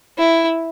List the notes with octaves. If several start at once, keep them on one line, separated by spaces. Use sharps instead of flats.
E4